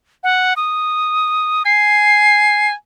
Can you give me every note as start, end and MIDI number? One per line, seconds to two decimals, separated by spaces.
0.24 0.54 78
0.56 1.63 87
1.66 2.73 80
1.66 2.68 96